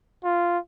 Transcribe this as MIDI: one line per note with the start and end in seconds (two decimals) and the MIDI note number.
0.24 0.58 65